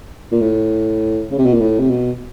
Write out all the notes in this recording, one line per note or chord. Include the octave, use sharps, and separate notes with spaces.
A#2
A2
C#3
C3
B2
A#2
A2
C3
B2